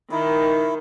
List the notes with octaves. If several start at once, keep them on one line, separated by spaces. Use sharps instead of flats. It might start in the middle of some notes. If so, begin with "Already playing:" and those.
D#3 E4